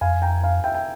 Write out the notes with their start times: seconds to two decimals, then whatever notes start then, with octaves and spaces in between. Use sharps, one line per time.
0.01 F2 F5 G#5
0.22 G5 A#5
0.43 F5 G#5
0.64 E5 G5
0.75 G5